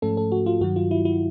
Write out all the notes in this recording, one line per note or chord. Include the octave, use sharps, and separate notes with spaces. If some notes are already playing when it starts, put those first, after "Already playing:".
G#2 F3 A3 C#4 A4
A4
F#4
F4
G2 D#3 F#3 F#4
F4
E4
E4